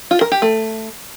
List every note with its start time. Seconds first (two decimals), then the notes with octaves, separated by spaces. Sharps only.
0.11 F4
0.21 A#4
0.32 G4
0.42 A3